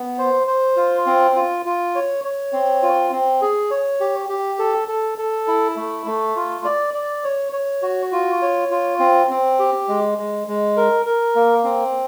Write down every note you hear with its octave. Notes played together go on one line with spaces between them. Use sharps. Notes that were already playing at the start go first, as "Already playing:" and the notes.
Already playing: B3
C5
C5
F4
C4
F4
F4
C#5
C#5
C4
F4
C4
G#4
C#5
G4
G4
A4
A4
A4
E4
A3
A3
F4
D5
D5
C#5
C#5
F#4
F4
C#5
F4
C4
C4
G4
G#3
G#3
G#3
A#4
A#4
A#3
C4